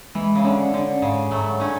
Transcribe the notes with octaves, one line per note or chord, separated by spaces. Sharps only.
E3 G#3
C#3
D3 C#4
D3 C#4
G#2 C#3
G#2 F#3 A3
A3 C#4 D4